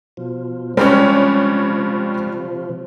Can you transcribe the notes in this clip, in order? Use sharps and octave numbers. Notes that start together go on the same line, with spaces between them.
B2 F3
G2 C3 F3 G3 G#3 C4 C#4 C#5